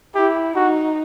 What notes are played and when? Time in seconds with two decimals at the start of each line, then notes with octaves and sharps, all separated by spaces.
0.15 E4 G4
0.56 D#4 F#4